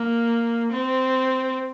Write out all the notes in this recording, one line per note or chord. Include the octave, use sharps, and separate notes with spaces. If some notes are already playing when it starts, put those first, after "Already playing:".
Already playing: A#3
C4